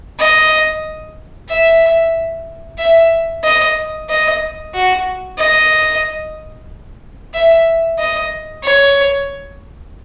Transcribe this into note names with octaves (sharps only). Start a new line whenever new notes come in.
D#5
E5
E5
D#5
D#5
F#4
D#5
E5
D#5
C#5